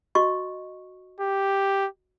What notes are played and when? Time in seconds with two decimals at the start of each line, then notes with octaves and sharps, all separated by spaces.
0.15 F#4 D#5 C#6
1.21 G4